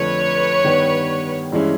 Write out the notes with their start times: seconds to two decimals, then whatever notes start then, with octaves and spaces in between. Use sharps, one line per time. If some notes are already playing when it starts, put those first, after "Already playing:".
Already playing: F2 D3 F3 A3 B4 C#5
0.64 G2 D#3 G3 B3
1.52 G2 E3 G#3 C#4 E4